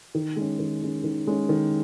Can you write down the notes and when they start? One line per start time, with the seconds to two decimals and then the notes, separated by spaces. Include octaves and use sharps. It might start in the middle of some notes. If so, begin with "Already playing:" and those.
0.15 D#3
0.36 G#3 C#4
0.59 D#3
0.82 G#3 C#4
1.04 D#3
1.27 G#3 C#4
1.49 D#3